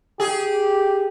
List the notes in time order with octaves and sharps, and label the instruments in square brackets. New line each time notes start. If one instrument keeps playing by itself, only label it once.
[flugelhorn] G4 [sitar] G#4